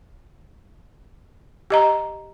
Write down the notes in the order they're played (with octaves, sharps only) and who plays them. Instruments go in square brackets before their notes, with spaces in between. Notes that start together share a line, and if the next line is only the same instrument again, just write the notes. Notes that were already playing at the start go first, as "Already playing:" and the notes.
[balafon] G4 D#5 A#5